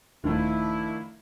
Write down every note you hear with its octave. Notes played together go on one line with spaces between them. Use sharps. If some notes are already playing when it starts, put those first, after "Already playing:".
D#1 D#3 F3 A3 D4 E4